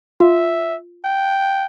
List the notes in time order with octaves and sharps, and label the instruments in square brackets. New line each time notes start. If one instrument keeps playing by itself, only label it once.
[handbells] F4 [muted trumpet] E5
[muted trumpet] G5